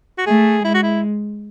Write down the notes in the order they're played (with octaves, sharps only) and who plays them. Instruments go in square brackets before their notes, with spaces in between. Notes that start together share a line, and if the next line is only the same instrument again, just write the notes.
[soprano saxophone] F#4
[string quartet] A3 [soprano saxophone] G#4
[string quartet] G#3 [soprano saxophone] E4
[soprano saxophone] F#4
E4